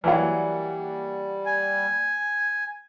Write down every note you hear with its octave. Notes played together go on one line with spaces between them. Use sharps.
E3 F#3 G3 A#3 D5 F#5
G#5